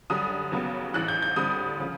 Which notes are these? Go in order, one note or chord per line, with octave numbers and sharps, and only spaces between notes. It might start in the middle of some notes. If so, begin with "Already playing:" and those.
F#2 D3 G3 D#6
D#2 C#3 F#3 B3
A1 G#2 E3 F#6
G6
G6
D2 D3 G3 C4 D#6
C#3 F3